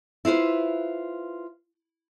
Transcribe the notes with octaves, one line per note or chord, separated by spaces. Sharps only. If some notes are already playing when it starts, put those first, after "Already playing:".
E4 F4 B4 C5